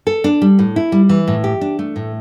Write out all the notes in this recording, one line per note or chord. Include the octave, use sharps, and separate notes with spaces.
A4
D4
G3
A2
E4
G3
E3
A2
G4
D4
A3
A2